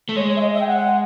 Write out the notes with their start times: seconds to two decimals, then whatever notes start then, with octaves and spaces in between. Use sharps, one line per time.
0.09 A3
0.16 G#3 C#5
0.28 C#5
0.36 E5
0.41 D#5
0.54 E5
0.60 G5
0.67 F#5